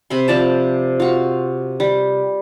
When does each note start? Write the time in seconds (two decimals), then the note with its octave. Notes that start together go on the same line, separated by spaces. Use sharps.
0.10 C3 B5 C6
0.28 F3 D5 A5
1.00 F4 F#4
1.80 G3